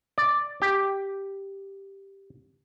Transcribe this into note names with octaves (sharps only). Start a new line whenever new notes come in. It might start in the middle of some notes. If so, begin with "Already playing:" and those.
D5
G4